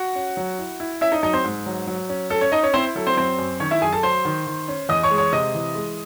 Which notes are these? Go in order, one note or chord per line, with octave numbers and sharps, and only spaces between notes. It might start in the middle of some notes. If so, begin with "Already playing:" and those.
Already playing: F#4 F#5
C#4
F#3
E4
E4
C#4 E4 E5
D#4 D#5
F#3 D#4 D#5
C4 C5
G#2
F#3
F#3
C#4
C#4 A4
C#4 C#5
C#4 D#4 D#5
C#4 C#5
C4 E4 C5
F#3 A4
C4 C5
F#2 C4 C5
F#2
D#3 C#4 C#5
E4 E5
F#2 G#4 G#5
A4 A5
F#3 C5 C6
D#3
D#3
C#4
E2 D#5 D#6
C#5 C#6
G#3
C#5 C#6
C3 D#5 D#6
E3
G#3